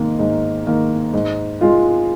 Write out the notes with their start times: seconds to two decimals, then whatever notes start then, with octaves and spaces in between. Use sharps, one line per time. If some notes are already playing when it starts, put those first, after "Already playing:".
Already playing: G#2 D#3 A#3
0.19 G#2
0.66 D#3 A#3
1.13 G#2
1.61 G#3 F4